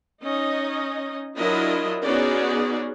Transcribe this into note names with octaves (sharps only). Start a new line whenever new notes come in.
C#4 D#4 D#5
F#3 D4 E4 F4 A#4 D#5
B3 C#4 D#4 F#4 G#4 D5